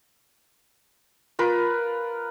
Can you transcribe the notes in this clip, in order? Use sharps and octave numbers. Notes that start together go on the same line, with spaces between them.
F4 A#4 B4